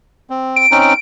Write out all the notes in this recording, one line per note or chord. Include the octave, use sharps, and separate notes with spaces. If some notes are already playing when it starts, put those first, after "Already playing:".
C4
D7
C4 C#4 D#4